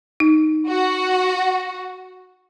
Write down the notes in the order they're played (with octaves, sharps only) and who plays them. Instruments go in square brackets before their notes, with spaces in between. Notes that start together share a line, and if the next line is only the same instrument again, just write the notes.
[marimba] D#4
[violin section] F#4